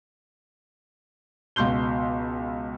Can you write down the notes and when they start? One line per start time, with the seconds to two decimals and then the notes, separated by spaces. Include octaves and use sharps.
1.56 C#2 B2 C6 G6 G7